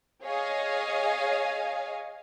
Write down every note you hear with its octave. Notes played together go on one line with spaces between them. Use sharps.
G#4 C#5 D#5 F5 G#5